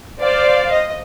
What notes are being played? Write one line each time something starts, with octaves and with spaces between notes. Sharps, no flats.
C5 D5 F5
D#5